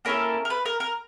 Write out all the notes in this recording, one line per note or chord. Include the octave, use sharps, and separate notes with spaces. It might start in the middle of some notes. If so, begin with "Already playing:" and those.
A#3 C#4 E4 A4 A#4
A#4
B4
A#4
A#4